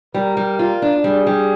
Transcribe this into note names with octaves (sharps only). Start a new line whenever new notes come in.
G3 A#4
G3
F4
D4
G3 G#4
G3